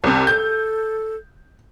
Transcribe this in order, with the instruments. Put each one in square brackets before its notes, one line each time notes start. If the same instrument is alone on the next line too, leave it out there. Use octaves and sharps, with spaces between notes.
[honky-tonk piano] C2 C3 [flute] A5
[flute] A4 [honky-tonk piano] G6